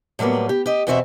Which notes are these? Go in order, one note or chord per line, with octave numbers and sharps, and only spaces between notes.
A2 F#3 G3 A#3 B3
G4
G4 D#5
E2 B2 C4 F#4 D#5 E5